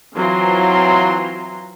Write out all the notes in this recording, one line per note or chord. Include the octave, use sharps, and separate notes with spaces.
E3 F#3 C4 F4 A#5 C6